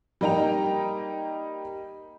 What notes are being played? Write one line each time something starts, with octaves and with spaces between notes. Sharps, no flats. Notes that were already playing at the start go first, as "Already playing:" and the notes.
G3 A#3 D#4 G5 A#5 F7